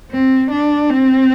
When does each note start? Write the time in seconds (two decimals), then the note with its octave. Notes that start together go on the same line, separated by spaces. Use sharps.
0.12 C4
0.51 D4
0.89 C4